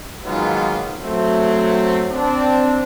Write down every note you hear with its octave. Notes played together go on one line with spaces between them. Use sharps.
D#3 F#3 G#3 A#3 B3 F4
F#3 A3 C4
C4 D4